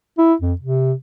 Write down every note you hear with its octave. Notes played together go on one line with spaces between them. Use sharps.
E4
F2
C3